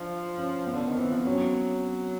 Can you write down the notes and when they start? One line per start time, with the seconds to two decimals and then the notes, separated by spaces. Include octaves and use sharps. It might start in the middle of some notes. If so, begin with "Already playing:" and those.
Already playing: F3 D4
0.38 C#4
0.67 B3
0.74 D3
0.87 D#3
0.96 E3 C4
1.12 F3
1.25 F#3 C#4